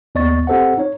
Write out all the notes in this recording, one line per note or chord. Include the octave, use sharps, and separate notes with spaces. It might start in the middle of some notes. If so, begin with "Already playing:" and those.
D#2 B3 D5 D#5 C#6 A6
C4 G4 A4 C5 D#5 F#5
D#4 C#5